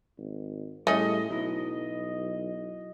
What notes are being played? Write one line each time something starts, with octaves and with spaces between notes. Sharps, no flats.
G#1
A2 G3 A3 C#4 G4 G#4 D#5
B1 F#3 E4